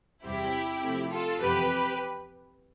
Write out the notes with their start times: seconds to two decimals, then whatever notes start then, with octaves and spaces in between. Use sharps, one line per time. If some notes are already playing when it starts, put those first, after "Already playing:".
0.23 E2 C3 G3 C4 E4 G4
0.81 C3 F3 A3 C4
1.11 F4 A4
1.40 F2 C3 E3 B3 G4 B4